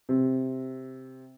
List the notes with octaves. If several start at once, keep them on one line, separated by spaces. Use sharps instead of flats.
C3